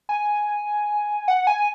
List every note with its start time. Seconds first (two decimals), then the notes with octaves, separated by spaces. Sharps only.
0.09 G#5
1.28 F#5
1.47 G#5